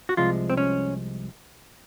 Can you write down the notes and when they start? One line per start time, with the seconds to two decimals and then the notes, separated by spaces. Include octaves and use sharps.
0.09 F#4
0.17 C2 C3 F3 G#3 F4
0.50 C4
0.57 C#4